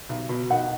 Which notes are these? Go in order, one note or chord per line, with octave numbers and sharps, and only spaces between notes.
B1
B2
D#4 F#5